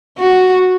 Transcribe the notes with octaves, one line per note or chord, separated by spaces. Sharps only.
F#4